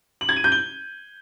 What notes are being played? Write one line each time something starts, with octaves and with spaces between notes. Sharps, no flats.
F#7
G#6
D#7
G6
G7